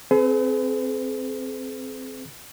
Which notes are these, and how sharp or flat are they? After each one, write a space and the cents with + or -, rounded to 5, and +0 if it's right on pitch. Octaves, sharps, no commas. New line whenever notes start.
C4 +0 G#4 +40 B4 +45